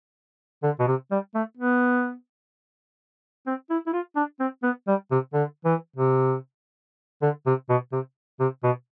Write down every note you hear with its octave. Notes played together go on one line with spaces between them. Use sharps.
D3
B2
C3
G3
A3
B3
C4
E4
E4
F4
D4
C4
B3
G3
C3
D3
E3
C3
D3
C3
B2
C3
C3
B2